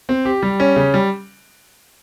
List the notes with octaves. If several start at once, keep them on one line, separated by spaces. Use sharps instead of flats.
C4
G4
G3
C#4
C#3
G3